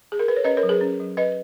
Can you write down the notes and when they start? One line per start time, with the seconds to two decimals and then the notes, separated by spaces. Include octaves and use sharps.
0.12 G#4
0.19 A#4
0.28 B4
0.37 C#5
0.44 C#4 B4 D#5
0.57 A#4 C#5
0.63 F#3
0.69 G#4 B4
0.81 C#4
1.00 F#3
1.17 F#3 B4 D#5